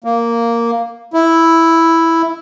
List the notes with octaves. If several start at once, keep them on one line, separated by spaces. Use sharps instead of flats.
A#3
E4